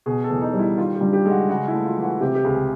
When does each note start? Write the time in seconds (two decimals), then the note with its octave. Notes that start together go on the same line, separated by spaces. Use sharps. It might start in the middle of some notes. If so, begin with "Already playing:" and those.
0.06 B2 G#4
0.24 A4
0.30 E2
0.42 D#4
0.53 G3
0.59 E4
0.78 D#3 F4
0.95 G4
1.01 G2
1.13 G4
1.26 G#3
1.31 F#4
1.49 C#3 F#4
1.68 A3 E4
1.86 F4
1.97 E3
2.03 F#4
2.21 C3 G4
2.35 G4
2.44 C#2 G#4